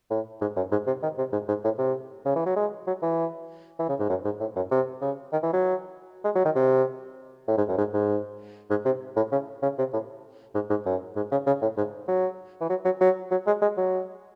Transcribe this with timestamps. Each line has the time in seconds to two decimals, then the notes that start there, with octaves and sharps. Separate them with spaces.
0.11 A2
0.41 G#2
0.56 F#2
0.72 G#2
0.87 C3
1.03 D#3
1.18 C3
1.33 G#2
1.48 G#2
1.64 A2
1.79 C3
2.26 C#3
2.36 E3
2.46 F#3
2.56 G#3
2.87 F#3
3.02 E3
3.79 E3
3.89 C#3
3.99 G#2
4.09 F#2
4.25 G#2
4.40 A2
4.56 F#2
4.71 C3
5.01 C#3
5.32 D#3
5.43 E3
5.53 F#3
6.25 G#3
6.36 F#3
6.45 D#3
6.55 C3
7.48 A2
7.57 G#2
7.68 F#2
7.78 G#2
7.94 G#2
8.70 G#2
8.85 C3
9.17 A2
9.32 C#3
9.63 C#3
9.78 C3
9.93 A2
10.55 G#2
10.70 G#2
10.86 F#2
11.16 G#2
11.32 C#3
11.47 C#3
11.62 A2
11.77 G#2
12.08 F#3
12.61 E3
12.69 F#3
12.85 F#3
13.01 F#3
13.31 F#3
13.47 G#3
13.62 G#3
13.77 F#3